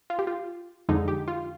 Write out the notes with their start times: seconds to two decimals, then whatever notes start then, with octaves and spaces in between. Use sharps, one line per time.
0.10 F4
0.19 G4
0.27 F4
0.89 F2 D3 G#3 D#4
1.08 G4
1.28 F4